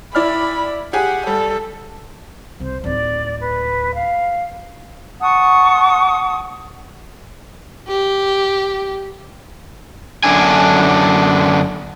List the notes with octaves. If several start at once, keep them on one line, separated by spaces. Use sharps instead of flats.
E4 D5 B5 F6
G4 G#4 F#5 G#5
G3 A4
C2 C5
D1 D#4 D5
B4
F5
F#5 A5 C#6 D#6
G4
F#2 D3 D4 G#5